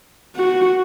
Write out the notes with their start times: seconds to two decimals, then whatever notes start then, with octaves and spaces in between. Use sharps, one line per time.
0.36 F#4